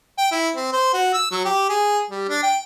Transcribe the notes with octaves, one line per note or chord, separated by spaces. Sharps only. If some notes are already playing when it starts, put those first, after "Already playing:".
G5
E4
C4
C5
F#4
E6
F#3
G4
G#4
G3
D4
G5